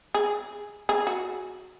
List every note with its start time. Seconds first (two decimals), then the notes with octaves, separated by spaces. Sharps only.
0.14 G#4
0.89 G#4
1.07 F#4